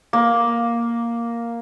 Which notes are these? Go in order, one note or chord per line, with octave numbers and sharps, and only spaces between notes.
A#3